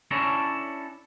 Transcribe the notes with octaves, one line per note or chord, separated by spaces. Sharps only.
C#4 D4 E4 A4 C#5 A#5